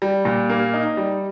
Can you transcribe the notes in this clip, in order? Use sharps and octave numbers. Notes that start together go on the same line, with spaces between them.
G3
A#2
A#3
D#4
G3